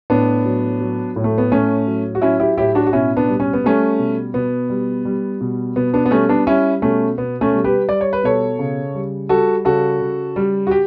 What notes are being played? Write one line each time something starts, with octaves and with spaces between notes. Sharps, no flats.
A2 B3 D4
F#3
F#3
A2
A3
B3
A2 A3 C#4
F#3
F#4
F#3 C#4 E4
E4 G4
A2 E4 G4
D4 F#4
F#4
B2 C#4 E4
B3 D4
G3
C#4
B3
G3 A3 C#4
B2
B2 B3
G3
G3
B2
B2 B3
B3 D4
B3
G3 A3 C#4
B3 D4
G3 C#4 E4
B2 A3 C#4
B2 B3
A3 C#4
G3
G4 B4
G3 D5
C#5
B4
B2 A4 C#5
C#3
G3
G3 F#4 A4
C#3 F#4 A4
C#3
G3
F#4
G4